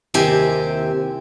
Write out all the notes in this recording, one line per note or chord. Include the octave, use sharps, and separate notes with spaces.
D#2 C3 C4 E4 G4 G#5